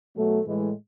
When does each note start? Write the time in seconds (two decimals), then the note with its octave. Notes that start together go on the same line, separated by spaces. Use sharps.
0.15 B2 F#3 A3
0.47 A2 E3 G#3